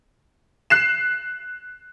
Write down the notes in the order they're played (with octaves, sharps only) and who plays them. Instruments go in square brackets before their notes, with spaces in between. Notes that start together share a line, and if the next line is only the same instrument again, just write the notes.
[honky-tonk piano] F#6 C7 E7